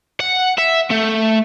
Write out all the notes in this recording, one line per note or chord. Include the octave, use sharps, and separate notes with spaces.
F#5
E5
A3